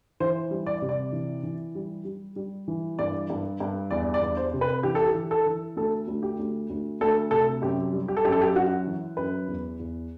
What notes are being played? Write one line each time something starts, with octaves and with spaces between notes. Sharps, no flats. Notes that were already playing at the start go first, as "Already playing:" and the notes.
E3 C5
G3
D5
C3
D5
E3
E3
G3
G3
G3
E3
G2 D5
G2
G2
E2 D5
D5
E2
C5
C3
B4
E3 G4
A4
G4
E3
A4
E3
D2 A4
D2
G4
D2
D2
D2 A4
C3 A4
F#2 G4
G3
G4
A4
F#2 G4
A4
G4
F#2 F#4
E3
F#2 B4
E2
E2